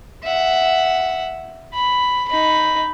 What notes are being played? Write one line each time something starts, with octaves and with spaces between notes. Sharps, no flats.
E5 F#5
B5
D#4 B5